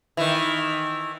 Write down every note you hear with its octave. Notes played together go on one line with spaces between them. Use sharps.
D#3 E3